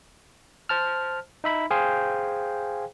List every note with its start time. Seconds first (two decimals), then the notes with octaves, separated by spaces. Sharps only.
0.69 C5 A5 F6
1.44 D#4 E5 B5
1.71 G#4 C5 F5 G5 G#5